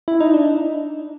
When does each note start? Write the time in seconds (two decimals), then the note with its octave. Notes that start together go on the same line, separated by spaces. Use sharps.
0.08 E4
0.21 D#4
0.34 D4